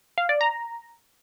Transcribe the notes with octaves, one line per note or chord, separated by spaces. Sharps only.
F5
D5
A#5